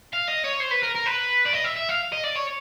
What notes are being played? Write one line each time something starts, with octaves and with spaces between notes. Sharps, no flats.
F5
D#5
C#5
C5
B4
A#4
A#4
B4
D5
D#5
E5
E5
F5
D#5
D5
C#5